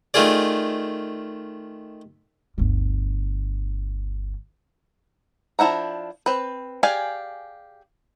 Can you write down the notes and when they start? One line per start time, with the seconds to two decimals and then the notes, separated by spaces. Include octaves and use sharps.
0.14 D#3 A3 F4 G#4 D5
2.58 G1 D2
5.59 F3 D4 E4 F#5 A#5
6.26 C4 B4
6.83 G4 G#4 D5 F5 G#5